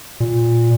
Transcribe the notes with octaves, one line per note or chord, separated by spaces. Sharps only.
A#2